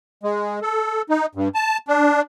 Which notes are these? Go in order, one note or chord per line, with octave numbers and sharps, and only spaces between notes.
G#3
A4
D#4
G2
A5
D4